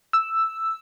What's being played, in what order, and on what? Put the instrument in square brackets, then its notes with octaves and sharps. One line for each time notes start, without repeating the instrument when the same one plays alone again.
[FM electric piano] E6